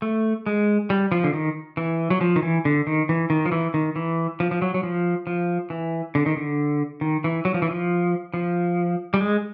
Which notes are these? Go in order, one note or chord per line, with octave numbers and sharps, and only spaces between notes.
A3
G#3
G3
F3
D3
D#3
E3
F#3
F3
D#3
E3
D3
D#3
E3
D#3
F3
E3
D#3
E3
F3
F3
F#3
F#3
F3
F3
E3
D3
D#3
D3
D#3
E3
F#3
F3
E3
F3
F3
G3
G#3